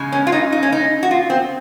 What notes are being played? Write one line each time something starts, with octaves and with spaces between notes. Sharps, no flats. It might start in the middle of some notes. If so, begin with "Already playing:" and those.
Already playing: C#3 G#3
C#4
F4
D#4
D#4
C#4
D#4
F#4
F4
C4